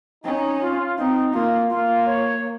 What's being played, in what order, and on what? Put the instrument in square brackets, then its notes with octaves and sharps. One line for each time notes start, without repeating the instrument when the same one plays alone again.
[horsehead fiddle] C#4 [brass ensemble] D#4
[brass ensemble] F4
[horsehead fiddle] C4 [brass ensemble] D#4
[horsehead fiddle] A#3 [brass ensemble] F4
[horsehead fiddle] A#3 [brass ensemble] F4
[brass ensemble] C#5